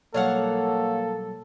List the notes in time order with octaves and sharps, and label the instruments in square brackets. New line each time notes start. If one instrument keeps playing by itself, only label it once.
[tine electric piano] B2 F#3 G3 [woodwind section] A#3 [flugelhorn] A4 [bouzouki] C#5 F5 F#5